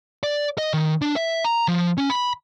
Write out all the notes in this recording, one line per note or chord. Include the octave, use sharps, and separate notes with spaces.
D5
D#5
D#3
D4
E5
A#5
F3
C#4
B5